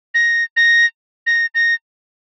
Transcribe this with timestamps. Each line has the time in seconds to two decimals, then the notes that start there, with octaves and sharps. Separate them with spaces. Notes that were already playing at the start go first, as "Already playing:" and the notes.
0.15 A#6
0.57 A#6
1.27 A#6
1.55 A#6